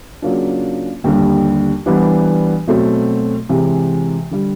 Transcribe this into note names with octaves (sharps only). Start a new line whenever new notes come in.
C#3 F#3 A#3 D4 F4
D#2 D3 G3
E3 G3 B3 D4
B2 F#3 A3 C4
C3 E3 G#3 C4
D3 G3